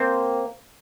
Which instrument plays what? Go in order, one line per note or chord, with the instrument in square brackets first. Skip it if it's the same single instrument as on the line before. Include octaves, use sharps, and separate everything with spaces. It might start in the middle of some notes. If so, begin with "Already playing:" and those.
Already playing: [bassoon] A#3 [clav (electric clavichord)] C4